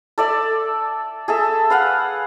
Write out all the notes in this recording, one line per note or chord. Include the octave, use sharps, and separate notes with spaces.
A4 D5 E5
G#4 A4 E5
B4 F5 F#5